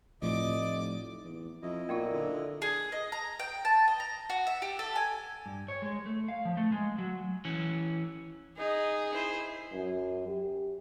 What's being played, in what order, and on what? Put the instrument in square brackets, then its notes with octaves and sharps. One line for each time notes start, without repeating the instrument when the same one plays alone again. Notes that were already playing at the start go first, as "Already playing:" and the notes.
[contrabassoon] F1 [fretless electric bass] A2 F3 [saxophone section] D5 D#5 [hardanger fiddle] D6
[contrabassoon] E2
[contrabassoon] F2 [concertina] E4 D#5
[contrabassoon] B1 [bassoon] A#2 [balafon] A#3 D#4 F4
[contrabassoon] D3
[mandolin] G#4
D#5
A#5
G5
A5
D#5
A#5
F#4
E5
G4
A4
G#5
[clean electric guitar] G2
C#5
G#3
A3
F5
F3
A3
G#3
F#3
E3 C#4
[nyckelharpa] D#4 D#5 [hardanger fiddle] G#4
[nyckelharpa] E4 C5
[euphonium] F#2
G4